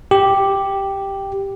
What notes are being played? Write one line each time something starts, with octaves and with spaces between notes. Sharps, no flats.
G4